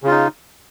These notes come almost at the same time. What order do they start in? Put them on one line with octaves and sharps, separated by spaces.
C#3 F4 D#4